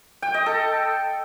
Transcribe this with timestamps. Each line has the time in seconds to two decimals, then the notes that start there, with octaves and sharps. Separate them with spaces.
0.22 G5
0.34 D#5
0.46 A4